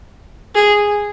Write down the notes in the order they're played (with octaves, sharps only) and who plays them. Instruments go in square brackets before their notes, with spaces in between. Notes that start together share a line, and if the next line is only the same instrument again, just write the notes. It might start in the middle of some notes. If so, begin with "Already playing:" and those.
[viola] G#4